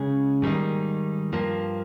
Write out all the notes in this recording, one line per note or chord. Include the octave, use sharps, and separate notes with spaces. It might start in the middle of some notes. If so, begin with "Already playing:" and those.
Already playing: C#3 G#3 C#4 G#4
G#2 D#3 G3 A#3 D#4
G2 F3 A#3